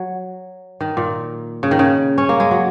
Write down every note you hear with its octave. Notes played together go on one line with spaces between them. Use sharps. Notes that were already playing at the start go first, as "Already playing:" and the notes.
Already playing: F#3
D#3
A#2
C#3
D#3
C#3
C#4
A#3
G#3
F#3